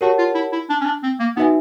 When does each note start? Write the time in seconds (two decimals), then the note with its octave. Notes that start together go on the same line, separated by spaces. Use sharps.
0.01 F#4 G4 A#4 C#5 F#5 A5
0.18 F4
0.35 E4
0.53 E4
0.70 D4
0.81 C#4
0.85 D4
1.03 C4
1.20 A#3
1.37 B3 D#4 F#4 B4 E5 G#5